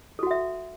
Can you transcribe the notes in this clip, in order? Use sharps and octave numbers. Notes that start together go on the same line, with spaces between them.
F#4 A4 E5 F#5